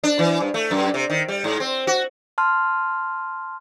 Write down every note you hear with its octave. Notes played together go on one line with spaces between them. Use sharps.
D4
E3
G2
A3
F#2
C3
D#3
G3
G#2
C4
F#4
A5 C6 F6